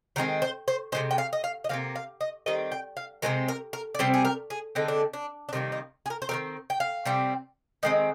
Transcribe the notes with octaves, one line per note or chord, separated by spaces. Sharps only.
D#3 G#3 C4 A#4
C5
C5
C3 F3 G#3 C5
G5
F5
D#5
F5
D#5
C3 F3 A#3 F5
F5
D#5
D#3 G3 C4 D#5
G5
F5
C3 D#3 G#3 C4 A#4
A#4
A#4
D5
C3 G3 C4 C5
G#4
A#4
G#4
D3 G#3 C4 D#4
D4
D4
D4
C3 D#3 G3 A#3 D#4
D#4
G#4
A#4
C5
D#3 G3 C4 A#4
G5
F5
C3 G3 C4
D#3 G#3 C4 D#5